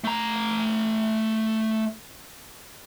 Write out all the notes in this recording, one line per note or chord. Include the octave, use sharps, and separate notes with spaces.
A3 A#5